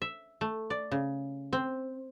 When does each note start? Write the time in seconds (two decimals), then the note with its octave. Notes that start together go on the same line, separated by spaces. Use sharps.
0.02 E5
0.41 A3
0.70 D5
0.92 C#3
1.53 C4